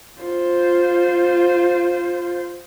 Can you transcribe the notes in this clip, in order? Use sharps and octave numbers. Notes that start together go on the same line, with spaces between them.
F4 C5